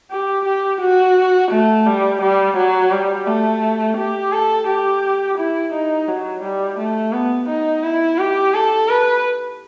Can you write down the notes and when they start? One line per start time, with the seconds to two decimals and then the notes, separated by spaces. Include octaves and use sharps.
0.10 G4
0.45 G4
0.81 F#4
1.51 A3
1.86 G3
2.21 G3
2.57 F#3
2.92 G3
3.27 A3
3.97 G4
4.32 A4
4.67 G4
5.38 E4
5.73 D#4
6.08 F#3
6.43 G3
6.78 A3
7.13 B3
7.48 D#4
7.84 E4
8.19 G4
8.54 A4
8.89 B4